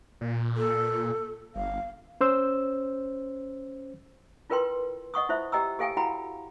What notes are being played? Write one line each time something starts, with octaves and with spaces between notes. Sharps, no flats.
A#2
A4
G1 F5
C#4 C5 E6
E4 F4 A#4 B4 G5 C6
D#5 F#5 C#6 D#6
E4 F4 C5 E5
G4 D#5 G5 A#5 E6
G4 A4 F5 G5 G#5
E4 F#4 F#5 G5 A#5 B5